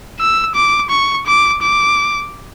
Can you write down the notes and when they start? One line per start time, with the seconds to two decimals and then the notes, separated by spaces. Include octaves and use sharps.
0.20 E6
0.55 D6
0.90 C#6
1.27 D6
1.62 D6